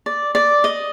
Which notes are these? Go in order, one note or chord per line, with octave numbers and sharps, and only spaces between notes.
D5
D5
D#5